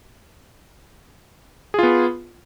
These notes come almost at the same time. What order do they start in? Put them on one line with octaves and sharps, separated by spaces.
G#4 F4 B3